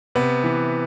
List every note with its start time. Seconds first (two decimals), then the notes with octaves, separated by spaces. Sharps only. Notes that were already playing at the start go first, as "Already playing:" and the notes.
0.15 C3 B3
0.44 E3